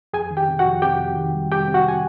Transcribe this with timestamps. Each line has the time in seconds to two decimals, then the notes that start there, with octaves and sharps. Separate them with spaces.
0.13 F2 G#4 G#5
0.31 D#3
0.37 G4 G5
0.49 C3
0.59 F#4 F#5
0.65 F2
0.82 C3 G4 G5
1.00 F2
1.16 D#3
1.35 G3
1.52 C3 G4 G5
1.68 C3
1.74 F#4 F#5
1.88 G#5